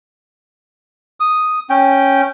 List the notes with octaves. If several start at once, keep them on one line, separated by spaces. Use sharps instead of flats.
D#6
C#4 G5